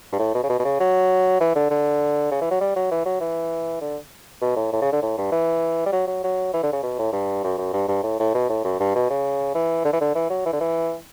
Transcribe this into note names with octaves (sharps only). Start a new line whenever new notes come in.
G2
A2
B2
C#3
B2
B2
C#3
F#3
E3
D3
D3
C#3
E3
F#3
G3
F#3
E3
F#3
E3
D3
B2
A2
A2
C#3
D3
A2
G2
E3
G3
F#3
F#3
F#3
E3
D3
C#3
B2
A2
G2
F#2
F#2
G2
G2
A2
A2
B2
A2
F#2
G2
B2
C#3
E3
D3
E3
D3
E3
F#3
E3
D3
E3